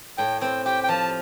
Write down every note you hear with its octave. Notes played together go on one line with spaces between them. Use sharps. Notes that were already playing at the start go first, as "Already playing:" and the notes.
A2 G5
C4 G5
G4 G5
G5
F3 A5